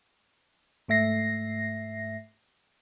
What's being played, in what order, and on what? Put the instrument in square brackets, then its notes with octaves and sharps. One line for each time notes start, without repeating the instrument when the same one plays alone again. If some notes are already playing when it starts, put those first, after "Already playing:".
[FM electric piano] G#2 A3 E5 A#6 C7